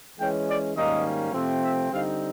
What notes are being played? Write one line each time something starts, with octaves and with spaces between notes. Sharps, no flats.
E3 G#3 C#4 G5
D5
G#2 D#3 G3 A#3 C#4 D#5
C3 F3 A3 C4
E5
D3 G3 C4 D#4 F5